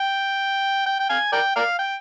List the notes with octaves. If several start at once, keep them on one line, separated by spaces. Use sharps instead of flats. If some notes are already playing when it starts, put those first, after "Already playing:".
Already playing: G5
G5
G5
F5 G#5
A#4 D5 G5
A#4 D5 F5
G5